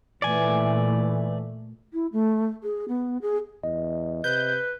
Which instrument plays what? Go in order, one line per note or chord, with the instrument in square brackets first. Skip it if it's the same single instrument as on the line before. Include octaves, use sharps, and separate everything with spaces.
[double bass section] A#2 A3 [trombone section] E3 [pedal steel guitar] D5 G#5
[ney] E4
A3
G#4
B3
G#4
[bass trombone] E2 [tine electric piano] D#5
[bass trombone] C3 [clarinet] B4 [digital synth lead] G6